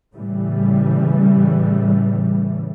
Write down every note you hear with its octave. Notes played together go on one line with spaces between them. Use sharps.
A2 C#3 E3 G3